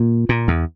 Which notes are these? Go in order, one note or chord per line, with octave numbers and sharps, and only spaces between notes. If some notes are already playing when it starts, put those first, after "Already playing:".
Already playing: A#2
A#2
E2